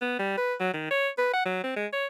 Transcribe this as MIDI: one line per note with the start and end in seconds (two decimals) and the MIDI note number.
0.02 0.19 59
0.19 0.37 55
0.37 0.54 71
0.60 0.72 54
0.74 0.86 51
0.91 1.09 73
1.18 1.30 71
1.33 1.44 78
1.46 1.62 54
1.64 1.74 60
1.76 1.87 56
1.93 2.06 73